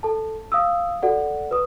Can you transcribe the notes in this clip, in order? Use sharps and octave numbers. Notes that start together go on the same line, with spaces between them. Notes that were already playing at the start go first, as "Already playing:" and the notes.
A4 A5
F5 D#6 E6
F#4 A4 D5 F#5
B4 D#6